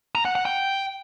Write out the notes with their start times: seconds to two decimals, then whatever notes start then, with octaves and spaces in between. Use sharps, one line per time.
0.15 A#5
0.25 F#5
0.35 F#5
0.45 G5